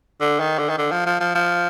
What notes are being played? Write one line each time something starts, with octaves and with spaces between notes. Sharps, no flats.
D3
D#3
D3
D#3
D3
F3
F3
F3
F3